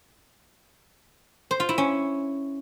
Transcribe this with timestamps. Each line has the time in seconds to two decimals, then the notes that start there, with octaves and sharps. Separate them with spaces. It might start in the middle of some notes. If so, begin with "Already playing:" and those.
1.51 C5
1.60 F4
1.69 E4
1.78 C#4